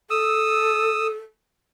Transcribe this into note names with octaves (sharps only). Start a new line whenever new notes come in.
A4 D#6 E6